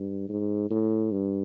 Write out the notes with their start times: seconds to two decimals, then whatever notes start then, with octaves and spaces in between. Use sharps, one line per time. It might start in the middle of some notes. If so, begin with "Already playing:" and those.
Already playing: G2
0.29 G#2
0.70 A2
1.12 G2